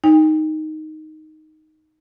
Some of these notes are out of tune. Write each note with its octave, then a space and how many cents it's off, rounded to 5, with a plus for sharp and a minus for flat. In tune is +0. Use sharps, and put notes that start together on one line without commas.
D#4 +0 G5 +45